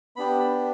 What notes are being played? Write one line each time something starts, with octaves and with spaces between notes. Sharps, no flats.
B3 D4 G4 B5
B5